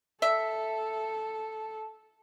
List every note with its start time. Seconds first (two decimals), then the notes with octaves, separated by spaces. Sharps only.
0.22 A4 E5